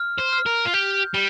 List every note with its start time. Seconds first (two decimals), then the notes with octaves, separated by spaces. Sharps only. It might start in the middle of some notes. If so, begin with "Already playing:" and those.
Already playing: F6
0.20 C5
0.33 F6
0.46 A#4
0.65 F4
0.74 G4 G6
1.14 G3 G7